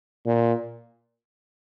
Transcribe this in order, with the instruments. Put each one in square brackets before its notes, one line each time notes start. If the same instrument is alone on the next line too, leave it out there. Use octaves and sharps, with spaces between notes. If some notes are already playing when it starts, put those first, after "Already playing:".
[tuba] A#2